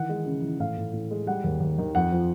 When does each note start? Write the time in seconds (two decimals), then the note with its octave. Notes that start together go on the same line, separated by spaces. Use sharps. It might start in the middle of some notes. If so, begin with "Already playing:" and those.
Already playing: D#3 E3 F#5
0.09 G#3
0.26 C#3
0.42 E3
0.59 A2 F5
0.77 A2
0.93 A2
1.11 G#3
1.27 G3 F#5
1.44 D#2
1.60 D#2
1.78 D#3
1.95 F2 F#5
2.12 F3